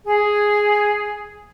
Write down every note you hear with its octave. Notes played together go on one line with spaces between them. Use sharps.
G#4